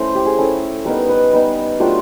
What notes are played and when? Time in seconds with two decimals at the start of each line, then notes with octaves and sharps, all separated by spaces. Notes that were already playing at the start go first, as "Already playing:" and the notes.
Already playing: A3 C#4 E4 C5
0.15 G4
0.26 G#4
0.38 A3 C#4 E4 A4
0.85 G3 B3 D#4 A#4
1.09 B4
1.33 G3 B3 D#4
1.80 F#3 A3 D4 F4 G4